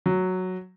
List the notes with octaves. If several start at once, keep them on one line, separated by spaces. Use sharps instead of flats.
F#3